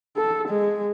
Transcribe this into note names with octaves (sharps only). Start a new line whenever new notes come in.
A4
G#3